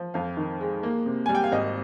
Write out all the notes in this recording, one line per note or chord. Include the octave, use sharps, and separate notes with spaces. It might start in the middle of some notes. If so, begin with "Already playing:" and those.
Already playing: F3
F2 F5
D#3
G#3
A#3
C3
G3 G#5
G5
F5
G#1 D#5